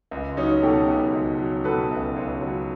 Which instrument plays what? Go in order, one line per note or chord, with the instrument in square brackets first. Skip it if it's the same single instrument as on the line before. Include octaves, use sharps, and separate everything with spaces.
[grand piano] C#2
F#3 C#4 D#4
B2 G4 A4
C#2
C#2
F#3
B2 A4 B4
C#2
C#2
F#3